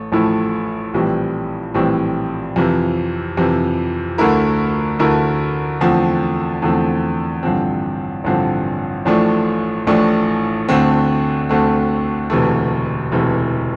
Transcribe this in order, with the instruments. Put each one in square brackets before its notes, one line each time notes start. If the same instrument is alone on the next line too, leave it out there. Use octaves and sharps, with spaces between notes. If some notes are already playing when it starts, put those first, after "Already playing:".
Already playing: [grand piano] A1 A3
A1 A2 F3 A3 E4
A#1 A2 E3 G3 C4
A#1 A2 E3 G3 C4
F2 C3 E3
F2 C3 E3
D2 D3 A3 E4 A#4
D2 D3 A3 E4 A#4
E2 D3 F3 A3 C4
E2 D3 F3 A3 C4
A1 G2 D3 F3 C4
A1 G2 D3 F3 C4
A1 A2 F3 A3 D4
A1 A2 F3 A3 D4
D2 D3 A3 C4
D2 D3 A3 C4
E1 D2 C3 E3 A3
E1 D2 C3 E3 A3